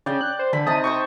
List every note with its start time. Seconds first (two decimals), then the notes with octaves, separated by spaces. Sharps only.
0.06 C#3 D5 G5
0.21 F#6
0.39 C5
0.53 D3 B5
0.67 C3 D#4 A5 D#6
0.84 C5 G5 C#6